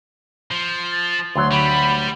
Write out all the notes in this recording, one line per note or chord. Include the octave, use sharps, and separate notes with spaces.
F3
A6
D2 F#3 C6
G3 B5